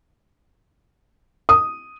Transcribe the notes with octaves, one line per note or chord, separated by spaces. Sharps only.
D#6